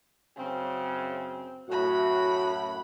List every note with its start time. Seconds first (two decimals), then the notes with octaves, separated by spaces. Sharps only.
0.36 F#2 C#3 C4
1.68 F#2 A2 F#4 F#5 B5